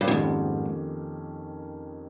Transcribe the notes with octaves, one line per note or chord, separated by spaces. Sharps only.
G2
F2 G#2 D#3 A#3 C#4 G4